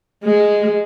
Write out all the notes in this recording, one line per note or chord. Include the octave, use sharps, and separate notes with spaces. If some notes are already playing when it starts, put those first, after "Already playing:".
G#3